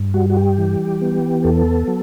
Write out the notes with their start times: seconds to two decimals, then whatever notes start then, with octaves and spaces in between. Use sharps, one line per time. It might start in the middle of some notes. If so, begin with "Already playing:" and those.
Already playing: G2
0.14 G3 F#4
0.30 F#4
0.37 G4
0.58 E3
1.02 B3
1.44 E2 A4
1.87 F#3